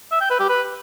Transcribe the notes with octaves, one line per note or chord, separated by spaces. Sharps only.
E5
G5
B4
G4
B4